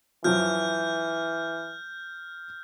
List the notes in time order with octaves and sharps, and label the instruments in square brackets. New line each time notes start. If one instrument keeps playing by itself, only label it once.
[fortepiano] F#2 F3 [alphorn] E3 [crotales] F6 G6